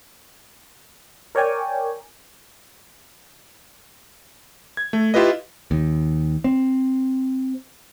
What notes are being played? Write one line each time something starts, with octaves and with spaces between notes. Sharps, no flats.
A#4 C#5 D5 G5 G#5
G#6
A3
E4 F4 G4 B4 D#5
D#2
C4